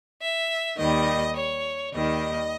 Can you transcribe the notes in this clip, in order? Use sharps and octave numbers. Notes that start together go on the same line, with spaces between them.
E5
D#2 D#3 G3 D#5
C#5
D#2 D#3 G3 D#5